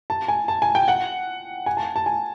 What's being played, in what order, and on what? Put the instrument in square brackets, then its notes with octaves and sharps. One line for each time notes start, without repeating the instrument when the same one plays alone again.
[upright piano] A5
G#5
A5
G#5
G5
F#5
G#5
A5
A5
G#5